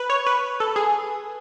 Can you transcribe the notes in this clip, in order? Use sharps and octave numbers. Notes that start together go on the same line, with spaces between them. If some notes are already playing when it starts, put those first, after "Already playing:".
Already playing: B4
C#5
B4
A4
G#4